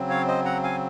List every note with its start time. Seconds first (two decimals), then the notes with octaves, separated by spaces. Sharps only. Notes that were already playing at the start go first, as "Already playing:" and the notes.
Already playing: C#3 F#3 C4
0.09 C#5 F5
0.28 C5 D#5
0.45 F#5 A#5
0.63 F5 G#5